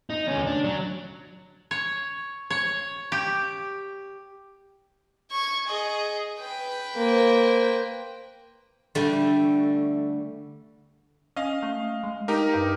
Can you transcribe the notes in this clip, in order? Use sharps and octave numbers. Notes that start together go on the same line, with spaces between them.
D#4
D2 C#4
D4
F#3
C#5
C#5
G4
C#6 G#6
G#4 D#5
B4 G5
A#3 C5
D3 G3 A3
C#4 D#5 F5
A3
G#3
D#4 G4 A#4
G2